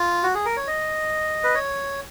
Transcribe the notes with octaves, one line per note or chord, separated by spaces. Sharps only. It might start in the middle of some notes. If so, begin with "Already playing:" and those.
Already playing: F4
F#4
G#4
A#4
C#5
D#5
B4
C#5